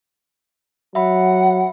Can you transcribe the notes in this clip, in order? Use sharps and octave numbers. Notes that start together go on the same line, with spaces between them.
F#3 E5 F#5 B5